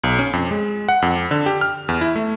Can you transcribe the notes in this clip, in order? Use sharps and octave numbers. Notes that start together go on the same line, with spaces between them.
B1
C#4
F2
G#3
F#5
F2
D3
G4
F6
E2
E4
A3